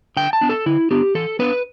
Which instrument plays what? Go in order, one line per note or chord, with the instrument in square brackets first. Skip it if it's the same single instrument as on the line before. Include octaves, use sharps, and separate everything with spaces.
[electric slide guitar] D3 G5
A5
B3 D4
A4
D3 E4
B3 D4 G4
E3 A4
B3 D4 B4